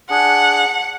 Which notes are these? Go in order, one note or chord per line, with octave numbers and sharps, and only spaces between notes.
D4 G#4 F#5